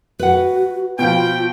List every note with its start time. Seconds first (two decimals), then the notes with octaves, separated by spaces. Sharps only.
0.19 F#4 B4 F#5
0.99 B2 F3 F4 G5